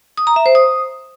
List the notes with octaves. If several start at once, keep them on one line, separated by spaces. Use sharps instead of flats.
D#6
A#5
E5
C5
D#6